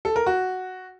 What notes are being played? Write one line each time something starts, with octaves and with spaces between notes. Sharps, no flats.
A4
A#4
F#4